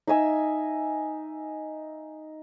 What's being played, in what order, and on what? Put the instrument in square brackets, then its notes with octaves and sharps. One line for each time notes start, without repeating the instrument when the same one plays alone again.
[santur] D#4 E5 G#5 E6